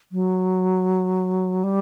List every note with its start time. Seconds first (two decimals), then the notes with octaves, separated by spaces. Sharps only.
0.12 F#3
1.64 G3